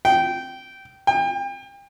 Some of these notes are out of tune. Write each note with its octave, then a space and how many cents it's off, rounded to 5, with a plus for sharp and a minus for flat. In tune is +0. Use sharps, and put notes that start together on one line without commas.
G5 -15
G5 +35